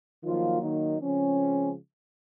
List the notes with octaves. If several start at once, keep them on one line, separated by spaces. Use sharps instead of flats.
D#3 F3 F#3 A#3 F4
D#3 D#4
C#3 F3 G#3 C4 C#4